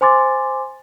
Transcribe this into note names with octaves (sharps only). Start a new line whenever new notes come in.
C5 G#5 C6 D6 A6